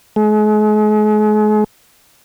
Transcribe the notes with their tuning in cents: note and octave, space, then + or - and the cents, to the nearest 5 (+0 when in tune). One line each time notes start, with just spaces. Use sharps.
G#3 +40